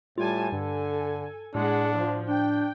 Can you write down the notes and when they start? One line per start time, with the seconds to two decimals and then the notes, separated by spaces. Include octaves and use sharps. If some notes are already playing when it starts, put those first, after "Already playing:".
0.18 A2 G3 F4 G#5 A5
0.52 G2 D3 A4 G#5
1.55 A2 G#3 D4 F#5
1.95 F3
2.28 D4 G5